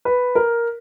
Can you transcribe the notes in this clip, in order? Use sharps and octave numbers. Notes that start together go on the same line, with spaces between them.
B4
A#4